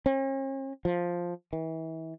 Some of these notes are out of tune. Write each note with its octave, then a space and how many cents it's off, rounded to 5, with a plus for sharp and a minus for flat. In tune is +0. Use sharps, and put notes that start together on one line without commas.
C#4 -45
F3 +5
E3 -35